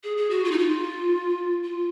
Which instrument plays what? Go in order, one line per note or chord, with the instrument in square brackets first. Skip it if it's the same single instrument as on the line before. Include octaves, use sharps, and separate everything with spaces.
[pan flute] G#4
G#4
F#4
F4
D#4
F4
F4